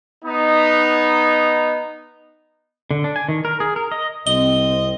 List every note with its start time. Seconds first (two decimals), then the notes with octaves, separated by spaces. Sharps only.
0.25 B3 D#4
2.91 D3
3.04 D4
3.16 G#5
3.29 D#3
3.45 A#4
3.60 G#4
3.76 A#4
3.92 D#5
4.27 C2 C4 D#5 G7